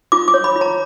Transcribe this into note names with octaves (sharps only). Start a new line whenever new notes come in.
F4 D6
D6
C#5
B5
F4
A#5